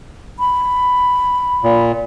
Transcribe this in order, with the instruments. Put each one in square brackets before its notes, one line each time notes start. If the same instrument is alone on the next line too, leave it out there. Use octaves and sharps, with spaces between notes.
[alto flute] B5
[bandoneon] A#2